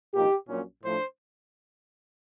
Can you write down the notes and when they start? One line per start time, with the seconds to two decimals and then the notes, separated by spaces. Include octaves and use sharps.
0.13 C2 A#2 F3 A#3 D#4 G4
0.48 A#1 A#2 F#3 A#3 C#4
0.83 A2 F3 A3 D4 C5